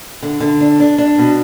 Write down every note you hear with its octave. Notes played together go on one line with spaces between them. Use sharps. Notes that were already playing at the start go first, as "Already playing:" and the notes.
D3
D3
D4
D4
D4
B2